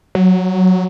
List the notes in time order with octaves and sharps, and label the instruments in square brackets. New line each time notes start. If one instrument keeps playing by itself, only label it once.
[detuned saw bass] F#3